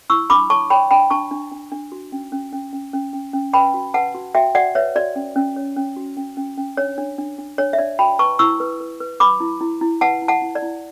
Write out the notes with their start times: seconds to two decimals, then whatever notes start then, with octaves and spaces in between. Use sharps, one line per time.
0.10 E4 C#6 E6
0.30 D4 B5 D6
0.50 C#5 A5 C#6
0.70 C#5 G5 B5
0.91 D4 G5 B5
1.10 D4 A5 C#6
1.31 D4
1.51 D4
1.72 D4
1.92 F#4
2.12 C#4
2.32 C#4
2.53 C#4
2.73 C#4
2.93 C#4
3.13 C#4
3.33 C#4
3.53 B4 G5 B5
3.74 F#4
3.94 B4 F#5 A5
4.15 F#4
4.35 F#4 E5 G5
4.55 F#4 D5 F#5
4.75 B4 C#5 E5
4.95 F#4 D5
5.16 C#4
5.36 C#4
5.56 C#5
5.76 C#4
5.96 F#4
6.17 C#4
6.37 C#4
6.58 C#4
6.77 D4 C#5
6.98 D4
7.18 D4
7.38 D4
7.58 D4 C#5
7.73 E5
7.78 D4 D5
7.99 F#4 G5 B5
8.19 B4 A5 C#6
8.39 E4 C#6 E6
8.60 B4
8.80 B4
9.00 B4
9.20 B4 B5 D6
9.40 E4
9.61 E4
9.81 E4
10.01 B4 F#5 A5
10.22 E4
10.28 F#5 A5
10.42 E4
10.55 D5
10.62 E4